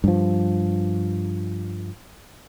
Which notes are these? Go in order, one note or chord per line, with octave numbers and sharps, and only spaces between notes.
G2 F3